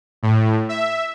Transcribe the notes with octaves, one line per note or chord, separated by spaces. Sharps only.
A2
E5